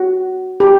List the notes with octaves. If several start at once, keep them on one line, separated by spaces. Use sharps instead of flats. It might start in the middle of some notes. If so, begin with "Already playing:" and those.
Already playing: F#4
G4